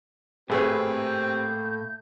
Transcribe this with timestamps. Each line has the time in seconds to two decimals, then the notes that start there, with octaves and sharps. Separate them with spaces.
0.50 G#1 A2 A3 A#3 C4 G4 G#4 B4
1.06 G6